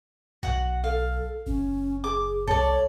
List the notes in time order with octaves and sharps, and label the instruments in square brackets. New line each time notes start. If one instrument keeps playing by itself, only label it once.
[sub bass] B1 [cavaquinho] F#4 F#5
[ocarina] A4 [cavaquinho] F5
[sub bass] F#1 [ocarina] C#4
[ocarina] G#4 [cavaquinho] D6
[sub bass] C2 [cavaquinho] A4 D5 [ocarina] C#5